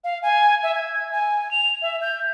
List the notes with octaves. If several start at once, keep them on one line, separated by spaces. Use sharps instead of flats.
F5
G#5
E5
G#6
G#5
F7
E5
G6